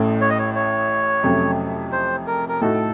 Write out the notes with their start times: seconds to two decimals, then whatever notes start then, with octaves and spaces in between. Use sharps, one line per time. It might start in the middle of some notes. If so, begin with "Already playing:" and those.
Already playing: A1 A2 A3 C#4
0.21 C#5
0.30 D#5
0.39 C#5
0.55 C#5
1.23 F2 C3 F#3 A3 C#4
1.92 C5
2.27 A#4
2.49 A#4
2.61 A2 A3 D#4 F#4 A4